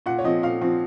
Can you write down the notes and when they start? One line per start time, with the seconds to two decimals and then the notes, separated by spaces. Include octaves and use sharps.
0.06 A#2 F#5
0.19 C#5
0.24 F3 C4 D#5
0.43 A#2 F5
0.61 F3 C4